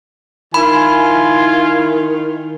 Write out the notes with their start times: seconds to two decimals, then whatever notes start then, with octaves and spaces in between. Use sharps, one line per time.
0.54 D#3 E4 F4 G#5 B5